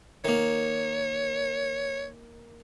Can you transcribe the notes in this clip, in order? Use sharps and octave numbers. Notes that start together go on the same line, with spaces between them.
D#3 A#3 C#5